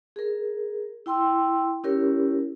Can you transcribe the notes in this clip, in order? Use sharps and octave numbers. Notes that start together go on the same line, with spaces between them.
G#4 A#4
E4 G5 C6 E6
C#4 E4 G4 A#4 C#5